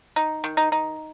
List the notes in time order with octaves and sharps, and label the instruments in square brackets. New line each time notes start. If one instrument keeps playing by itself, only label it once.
[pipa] D#4
D#3
D#4
D#4